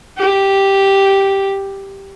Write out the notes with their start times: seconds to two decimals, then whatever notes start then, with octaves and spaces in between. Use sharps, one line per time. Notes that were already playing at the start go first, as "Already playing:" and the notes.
0.18 G4